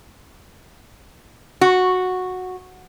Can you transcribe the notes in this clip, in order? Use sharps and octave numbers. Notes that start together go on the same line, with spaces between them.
F#4